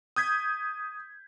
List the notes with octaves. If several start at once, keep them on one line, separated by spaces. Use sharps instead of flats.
D#6 G6 G#6 B6